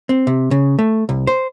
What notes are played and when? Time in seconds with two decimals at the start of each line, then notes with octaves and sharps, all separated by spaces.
0.09 C4
0.27 C3
0.51 C#3
0.79 A3
1.09 C2
1.27 C5